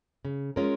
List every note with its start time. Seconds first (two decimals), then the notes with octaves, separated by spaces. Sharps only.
0.25 C#3
0.56 G#3 C#4 F4 A#4